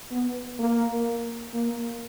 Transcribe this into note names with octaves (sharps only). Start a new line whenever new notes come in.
B3
A#3
A#3